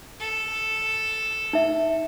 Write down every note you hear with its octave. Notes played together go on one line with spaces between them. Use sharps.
A4
D#4 E5